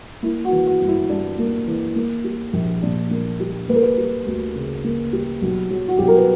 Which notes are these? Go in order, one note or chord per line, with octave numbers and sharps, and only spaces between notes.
A#3 E4
F#4
E3
F#4
G1
E4
G2 D4
A#3
E3
A#3
G3
A#1
A#2 D4
A#3
G3
A#3 B4
A#4
B4
G3
D2
C#3
A#3
G3
B1
F#3
F#4
B1 G4
A#4
B4